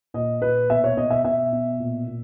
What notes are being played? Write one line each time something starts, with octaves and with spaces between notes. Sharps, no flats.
A#2 D#5
A#2 B4
B2 E5
C#5
B2 D#5
E5
B2 E5
B2
A#2
A#2